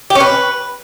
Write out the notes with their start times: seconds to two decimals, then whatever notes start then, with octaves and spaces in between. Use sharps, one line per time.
0.10 G4
0.15 C#4
0.20 B4